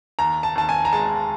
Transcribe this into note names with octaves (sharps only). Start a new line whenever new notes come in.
D#2 A#5
A5
D#2 A5
G#5
A#5
G#3 A5